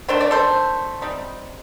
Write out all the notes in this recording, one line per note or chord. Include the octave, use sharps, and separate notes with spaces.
D#3 A3 D4 C5
D5
A4 C5
G3 C4 D#4